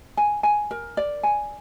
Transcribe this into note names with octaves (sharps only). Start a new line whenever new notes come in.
G#5
G#5
A#4
D5
G#5